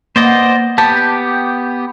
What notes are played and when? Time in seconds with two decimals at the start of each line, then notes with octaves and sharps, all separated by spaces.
0.16 A#3 B3 C5 D5 D#5
0.78 B3 G4 D5 A5